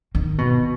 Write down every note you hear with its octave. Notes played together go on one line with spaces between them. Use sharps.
D#3
B2